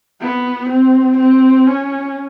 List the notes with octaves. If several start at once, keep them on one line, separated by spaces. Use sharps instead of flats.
B3
C4
C4
C#4